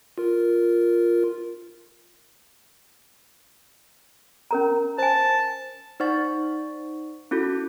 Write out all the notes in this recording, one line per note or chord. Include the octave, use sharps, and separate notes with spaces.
F4 A#4
C#4 A#4 A#5
C5 G#5 A5
D#4 C5 D5 F#5 C#6 A6
C#4 E4 F#4 A4